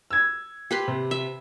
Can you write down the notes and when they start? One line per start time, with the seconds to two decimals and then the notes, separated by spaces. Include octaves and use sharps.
0.11 E6 G#6
0.71 G4 B4 C6
0.88 C3
1.11 E5